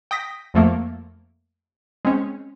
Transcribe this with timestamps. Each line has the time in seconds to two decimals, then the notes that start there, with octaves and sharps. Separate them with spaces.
0.11 G5 D#6 A#6 B6
0.54 F2 F3 A3 A#3
2.05 G#3 C4 C#4